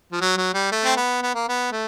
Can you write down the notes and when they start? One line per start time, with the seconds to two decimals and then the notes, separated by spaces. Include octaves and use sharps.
0.12 F3
0.21 F#3
0.37 F#3
0.54 G3
0.72 A3
0.84 C4
0.97 B3
1.22 B3
1.35 A#3
1.48 B3
1.72 A3